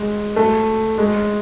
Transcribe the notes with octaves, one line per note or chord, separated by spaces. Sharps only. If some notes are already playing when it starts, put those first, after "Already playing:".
Already playing: G#3
A3
G#3